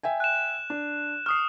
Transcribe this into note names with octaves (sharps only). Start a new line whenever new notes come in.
E5 G5 G#5
F#6 E7
D4
C#6 D#6 F6 C7